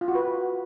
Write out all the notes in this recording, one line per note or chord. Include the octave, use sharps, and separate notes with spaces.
F4
F#4
B4